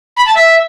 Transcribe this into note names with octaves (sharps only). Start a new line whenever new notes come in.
B5
A5
E5